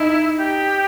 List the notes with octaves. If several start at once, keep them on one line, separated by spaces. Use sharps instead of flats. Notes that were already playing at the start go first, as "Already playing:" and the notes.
Already playing: D#4 E4
G4